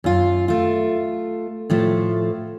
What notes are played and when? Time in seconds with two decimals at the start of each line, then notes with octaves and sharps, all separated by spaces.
0.04 F#2 F4
0.48 A3 F4
1.70 A2 F3 A3